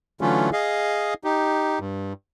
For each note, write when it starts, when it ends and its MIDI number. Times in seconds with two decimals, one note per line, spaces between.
0.21 0.50 50
0.21 0.50 52
0.21 0.50 54
0.21 0.50 57
0.21 0.50 61
0.21 0.50 65
0.53 1.14 68
0.53 1.14 75
0.53 1.14 77
1.24 1.79 63
1.24 1.79 67
1.80 2.13 43